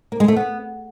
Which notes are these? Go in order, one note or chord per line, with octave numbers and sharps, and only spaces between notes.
A#3
G#3
A3
B3